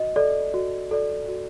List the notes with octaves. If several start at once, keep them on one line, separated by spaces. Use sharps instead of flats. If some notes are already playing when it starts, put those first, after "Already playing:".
Already playing: F#4 D#5
A4 D5
F#4
A4 D5
F#4